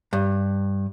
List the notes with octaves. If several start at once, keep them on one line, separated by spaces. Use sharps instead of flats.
G2